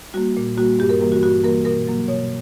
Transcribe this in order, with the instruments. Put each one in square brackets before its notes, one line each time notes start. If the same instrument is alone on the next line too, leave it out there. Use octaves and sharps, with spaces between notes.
[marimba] G3 A#3 F#4
A#2
G3 A#3 F#4
G2 G4
A#4
E3 G3 A#3 A#4
F#4
G2 F#4
E3 G3 A#3 A#4
B2 A#4
F#3 A#3
B2 C#5